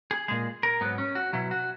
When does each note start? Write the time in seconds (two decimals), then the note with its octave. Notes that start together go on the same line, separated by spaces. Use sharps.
0.11 G#4
0.28 A#2 G#3 G#4
0.63 A#4
0.81 G#2 F#3 B3
0.98 C#4
1.15 F#4
1.33 B2 F#3 E4
1.51 F#4